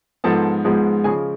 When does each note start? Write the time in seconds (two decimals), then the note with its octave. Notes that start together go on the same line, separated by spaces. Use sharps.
0.24 G#2 F3 G#3 B3 A4 A5
0.64 G#2 F3 G#3 B3
1.04 C#3 F3 G#3 G#4 G#5